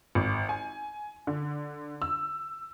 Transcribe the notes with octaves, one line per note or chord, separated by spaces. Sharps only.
G#1
G#5
D3
E6